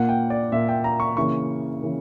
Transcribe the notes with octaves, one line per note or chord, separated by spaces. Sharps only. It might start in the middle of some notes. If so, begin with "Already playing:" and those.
Already playing: A#2 A#3 F#5
G5
D5
A#2 A#3 E5
G5
A#5
C#6
C#3 E3 A#3 C#6
C#3 E3 A#3